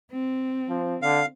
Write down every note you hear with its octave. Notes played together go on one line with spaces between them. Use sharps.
C4
F3
D3 F5